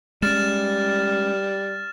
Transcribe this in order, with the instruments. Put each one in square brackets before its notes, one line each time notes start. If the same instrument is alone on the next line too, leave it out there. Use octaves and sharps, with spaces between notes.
[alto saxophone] G3 [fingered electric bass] G#3 C#4 [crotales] F6 A6 E7